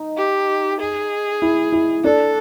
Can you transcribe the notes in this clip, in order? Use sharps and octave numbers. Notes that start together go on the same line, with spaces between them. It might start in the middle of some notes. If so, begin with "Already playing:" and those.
Already playing: D#4
G4
G#4
E4
E4
D4 A4